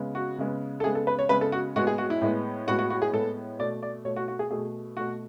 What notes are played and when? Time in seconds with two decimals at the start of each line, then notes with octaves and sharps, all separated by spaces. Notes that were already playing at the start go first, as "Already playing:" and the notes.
Already playing: C#3 G#3 B3
0.15 F#4
0.38 C#3 G#3 B3
0.80 A4
0.84 C#3 G#3 B3 G#4
0.95 A4
1.07 B4
1.19 C#5
1.29 C#3 G#3 B3 B4
1.41 A4
1.52 F#4
1.76 A2 G#3 B3 F#4
1.87 G#4
1.98 F#4
2.10 E4
2.21 A2 G#3 B3
2.67 A2 G#3 B3 F#4
2.79 F#4
2.90 F#4
3.02 G#4
3.13 A2 G#3 B3 A4
3.59 B2 A3 D5
3.83 D5
4.05 B2 A3 C#5
4.16 F#4
4.28 F#4
4.39 G#4
4.51 B2 A3 G#4
4.97 B2 A3 F#4